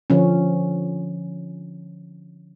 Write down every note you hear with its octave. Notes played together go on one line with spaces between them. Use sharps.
D3 F3 C#4